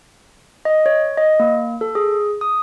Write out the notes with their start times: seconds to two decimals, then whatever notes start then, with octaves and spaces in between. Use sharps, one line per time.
0.65 D#5
0.86 C#5
1.18 D#5
1.40 A#3
1.81 A4
1.95 G#4
2.41 D#6